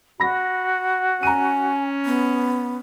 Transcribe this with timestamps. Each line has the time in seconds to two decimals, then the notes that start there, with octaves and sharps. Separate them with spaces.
0.20 F#4 B5 A#6
1.23 C#4 G#5 A#5 D#7
2.06 B3